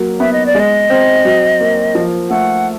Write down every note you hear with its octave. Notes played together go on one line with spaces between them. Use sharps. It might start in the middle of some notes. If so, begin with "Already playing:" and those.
Already playing: F#3 A#3
B3 E5
D#5
D5
G#3 D#5
C4
F#3
A#3
F3
A3 F#5